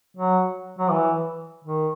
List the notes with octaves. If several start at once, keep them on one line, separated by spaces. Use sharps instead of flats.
F#3
F#3
E3
D#3